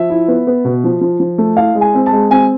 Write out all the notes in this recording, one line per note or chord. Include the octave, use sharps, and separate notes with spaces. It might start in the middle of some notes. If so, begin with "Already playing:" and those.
Already playing: F3 E5
E4
B3
B3
B2
F3
F3
F3
A3
E4 F5
G#3
G#5
C4
A5
G#3
C4 G#5